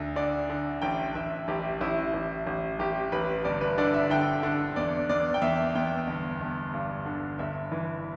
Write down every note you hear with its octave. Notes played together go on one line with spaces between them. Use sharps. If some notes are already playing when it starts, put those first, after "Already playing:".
Already playing: D2 D3
D3 D5
D3
A1 G5
A1 E5
A1 G4
A1 E4
A1
A1
A1 G4
A1 B4
G1 D5
B4
D3 D5
E5
D3 G5
D3
E2 D5
E2 D5
G5
E2 E5
E2 G5
G1
G1
G2
D3
G1 E5
E3